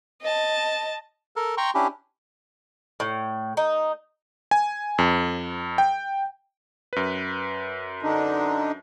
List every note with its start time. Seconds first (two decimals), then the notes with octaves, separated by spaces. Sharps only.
0.22 D#5 A5
1.36 A4 A#4
1.57 G5 A#5 C6 C#6
1.75 C#4 D4 E4 G4
3.00 A2
3.57 D#4
4.51 G#5
4.98 F2
5.78 G5
6.93 F#2 B4
8.02 D3 D4 D#4